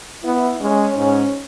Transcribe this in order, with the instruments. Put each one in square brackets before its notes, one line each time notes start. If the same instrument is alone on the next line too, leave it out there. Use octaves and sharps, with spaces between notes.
[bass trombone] B3 [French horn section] E4
[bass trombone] G#3 [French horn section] C#4
[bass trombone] G#2 [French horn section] C#4